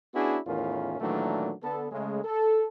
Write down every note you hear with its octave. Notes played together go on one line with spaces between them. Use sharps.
B3 C#4 D4 E4 F#4 G#4
E2 A2 D#3 C#4 F4 A#4
A#2 D#3 E3 F#3 A3 D4
D3 B3 A4
C#3 G#3 A3
A4